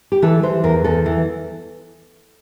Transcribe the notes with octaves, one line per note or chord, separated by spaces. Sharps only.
G4
E3 A4
E3 C5
E2 A#4
E2 A4
E3